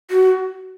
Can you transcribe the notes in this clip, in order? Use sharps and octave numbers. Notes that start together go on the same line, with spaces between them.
F#4